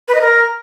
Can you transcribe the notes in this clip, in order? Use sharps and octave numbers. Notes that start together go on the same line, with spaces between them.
B4
D#5
A#4